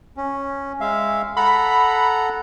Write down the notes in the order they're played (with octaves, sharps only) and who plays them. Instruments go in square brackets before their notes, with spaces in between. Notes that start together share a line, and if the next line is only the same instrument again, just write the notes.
[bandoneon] C#4
G#3 E5 F5
[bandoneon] A4 F#5 A#5 [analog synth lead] B5